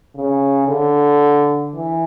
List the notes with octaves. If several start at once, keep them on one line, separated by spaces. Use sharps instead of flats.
C#3
D3
E3